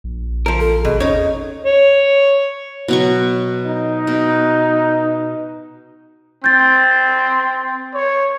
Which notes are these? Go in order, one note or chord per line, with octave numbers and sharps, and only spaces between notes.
A#1
F3 A#4
A4
G#1 B2 G#4
E2 C#4 D#4 C#5
C#5
B2 F#3 C#6
D#4
B2
C4 G6 A6
C#5